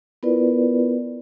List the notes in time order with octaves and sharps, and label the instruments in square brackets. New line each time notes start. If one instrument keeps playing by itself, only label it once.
[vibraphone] B3 E4 F4 A#4 B4 D5